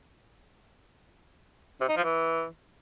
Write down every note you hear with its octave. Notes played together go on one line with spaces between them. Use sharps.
C3
D#4
F3
E3